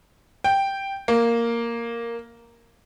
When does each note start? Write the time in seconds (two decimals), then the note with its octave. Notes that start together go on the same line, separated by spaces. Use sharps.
0.44 G5
1.08 A#3